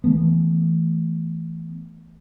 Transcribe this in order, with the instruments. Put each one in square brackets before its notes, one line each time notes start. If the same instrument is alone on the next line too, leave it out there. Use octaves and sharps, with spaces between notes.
[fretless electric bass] E3 A3 B3